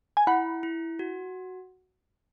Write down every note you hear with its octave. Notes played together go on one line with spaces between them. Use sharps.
G#5
E4 F#5 B5
E4
F#4